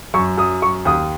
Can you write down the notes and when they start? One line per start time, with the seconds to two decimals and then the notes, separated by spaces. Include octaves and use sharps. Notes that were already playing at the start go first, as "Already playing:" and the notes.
0.14 F#2 C#6
0.38 F#2 D#6
0.62 F#2 C#6
0.85 D#2 D#6